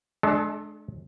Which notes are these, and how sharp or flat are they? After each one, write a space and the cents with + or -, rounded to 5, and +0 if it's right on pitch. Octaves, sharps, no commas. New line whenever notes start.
G#3 +45 D4 +20 A4 +0